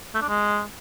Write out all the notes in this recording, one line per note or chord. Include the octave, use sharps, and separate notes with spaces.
A3
D4
G#3